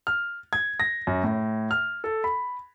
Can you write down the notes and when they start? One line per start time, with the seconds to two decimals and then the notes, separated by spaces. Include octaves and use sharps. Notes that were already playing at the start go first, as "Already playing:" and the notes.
0.07 F6
0.53 G#6
0.80 A#6
1.07 F#2
1.24 A2
1.71 F6
2.04 A4
2.24 B5